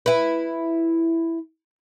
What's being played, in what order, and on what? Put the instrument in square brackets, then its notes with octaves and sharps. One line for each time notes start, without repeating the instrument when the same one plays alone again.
[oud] E4 B4